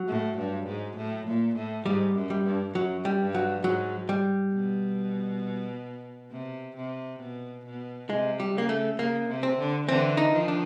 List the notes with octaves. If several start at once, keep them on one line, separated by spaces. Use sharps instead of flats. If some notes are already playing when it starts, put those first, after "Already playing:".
Already playing: F#3
A2
G2
G#2
A2
A#2
A2
G#2 G3
F#2
G3
G2
F#2 F#3
G3
G2
F#3
G#2 F#3
G3
B2
C3
C3
B2
B2
C3 G#3
G3
C#3 A#3
A3
C#3 A#3
C3
C4
D3
D3 E3 C4
D#4
D#3 F3
D4